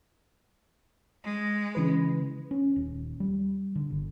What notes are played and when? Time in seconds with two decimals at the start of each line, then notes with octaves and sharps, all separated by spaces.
1.25 G#3
1.75 C#3 E3 B4
2.51 C#4
2.76 D#1
3.20 G3
3.76 D3
3.90 G1